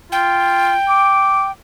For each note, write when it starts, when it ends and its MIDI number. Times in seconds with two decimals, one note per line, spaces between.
0.12 0.73 65
0.12 1.51 79
0.89 1.47 86